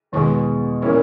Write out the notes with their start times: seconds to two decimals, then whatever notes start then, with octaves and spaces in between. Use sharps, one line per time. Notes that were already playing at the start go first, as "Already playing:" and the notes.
0.12 E2 B2 D#3 G#3
0.82 A#2 E3 A#3 C#4 E4